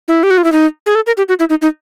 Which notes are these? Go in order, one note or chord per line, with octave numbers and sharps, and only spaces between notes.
E4
G4
F#4
F4
E4
D#4
G#4
A4
A#4
G4
F#4
E4
D#4
D#4